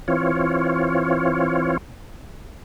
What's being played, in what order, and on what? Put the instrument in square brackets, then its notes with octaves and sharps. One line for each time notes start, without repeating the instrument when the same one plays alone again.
[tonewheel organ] E3 C4 F4 C#5